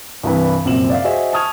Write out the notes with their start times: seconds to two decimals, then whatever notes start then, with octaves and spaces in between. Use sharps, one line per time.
0.23 C2 G2 E3 B4
0.65 A#1 F#2 C3 C5 E7 F#7
0.90 D5 E5 F5
1.04 F#4 G#4 C5 D#5 E5
1.33 A5 C#6 D#6 F6 G#6 F7